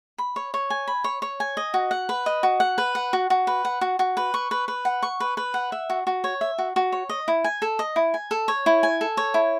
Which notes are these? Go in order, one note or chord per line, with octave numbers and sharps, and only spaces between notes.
B5
C#5
C#5
G#5
B5
C#5
C#5
G#5
D#5
F#4
F#5
B4
D#5
F#4
F#5
B4
F#5
F#4
F#4
B4
F#5
F#4
F#4
B4
C#6
B4
B4
F#5
C#6
B4
B4
F#5
E5
F#4
F#4
C#5
E5
F#4
F#4
C#5
D#5
E4
G#5
A4
D#5
E4
G#5
A4
C#5
E4
G#5
A4
C#5
E4